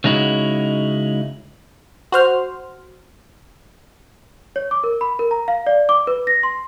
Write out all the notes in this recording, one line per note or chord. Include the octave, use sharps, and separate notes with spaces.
C#3 G#3 D#4 E4 F#4
F#4 C5 F6
C#5
D6
A#4
B5
A#4
A#5
F5
D5
D6
B4
A#6
C6